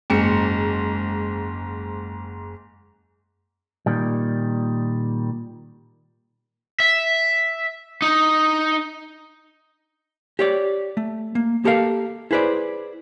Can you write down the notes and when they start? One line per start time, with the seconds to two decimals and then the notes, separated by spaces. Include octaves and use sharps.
0.10 F#1 G#2 C#7
3.86 A#2 D#3 G3
6.80 E5
8.02 D#4
10.39 G4 C#5 D5
10.97 A3
11.35 A#3
11.65 A#3 G4 A4 A#4 F5
12.31 E4 G#4 B4 C5 D5